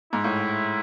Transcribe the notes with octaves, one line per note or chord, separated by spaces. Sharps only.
G#2 E4
A2